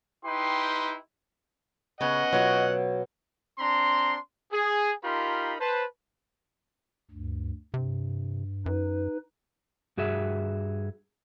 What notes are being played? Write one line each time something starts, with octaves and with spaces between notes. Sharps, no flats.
D#4 E4 G4 B4 G5 C6
C#3 B3 C#4 D#5 F#5
B2 F#3 F4 C#5
C4 D4 A#5 C6
G#4
D#4 F4 G4 A#4 B5 C6
B4 C5 A5
D2 G2
G2 C3
F#2 D#4 B4
G2 F#4 G#4 E5